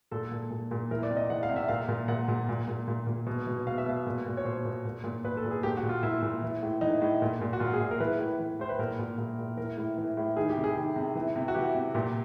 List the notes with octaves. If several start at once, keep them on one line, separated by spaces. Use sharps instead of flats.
A#2 A4
A#2
A#2
A#2
E3 A#4
D5
C3
D#5
E3 F#5
F5
C3
E5
A#2 F5
A#2
A#2 F#5
A#2
A#2
A#2
A#2
A#2
B2
B2
B2 F5
E5
B2 F5
A#2
A#2
C#5
A#2 C5
A#2
A#2
A#2
A#2 B4
A4
A#2
G#4
A#2 G4
F#4
A#2
F4
A#2 E4
A#2
E3
A2
E3 D#4
A2
A#2
A#2
F#4
A#2 F4
G#4
A#2
A#4
E3 B4
A2
E3
A2 C5
B4
A#2 A#4
A#2
A#2
A#2
E3 A#4
A2
E3
A2
D#3 G#4
G4
C3
G#4
D#3
C3
E3
C3
F#4
E3 G4
C3
A#2 G4